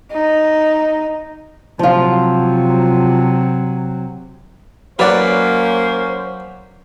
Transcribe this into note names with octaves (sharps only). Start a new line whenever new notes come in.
D#4
C3 F3 F#3 F4
F#3 A#3 C#4 B4 C5 D5 F#5